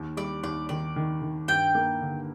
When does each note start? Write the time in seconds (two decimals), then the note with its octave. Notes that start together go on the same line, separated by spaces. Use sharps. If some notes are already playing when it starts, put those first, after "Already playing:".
Already playing: D#2
0.17 G3 D5
0.43 D#2 D5
0.69 D#3 D5
0.96 D#3
1.22 D#3
1.48 G2 G5
1.75 A#3
2.01 D3